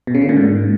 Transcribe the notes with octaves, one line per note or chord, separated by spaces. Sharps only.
B2
C#3
D3
A#2
G#2